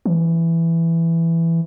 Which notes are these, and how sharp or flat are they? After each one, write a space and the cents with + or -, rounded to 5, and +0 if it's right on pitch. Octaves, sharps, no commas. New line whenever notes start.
E3 +10